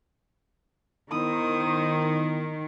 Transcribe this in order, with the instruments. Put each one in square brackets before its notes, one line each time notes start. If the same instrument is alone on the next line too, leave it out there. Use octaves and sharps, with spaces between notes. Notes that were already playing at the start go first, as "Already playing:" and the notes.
[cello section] D#3 [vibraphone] B3 D#4 E4 [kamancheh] C5 D#6